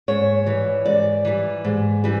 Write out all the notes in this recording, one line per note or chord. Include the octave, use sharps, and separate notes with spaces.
G#2 C#5
E3 G3
G#2 D5
E3 G3
G#2
E3 G3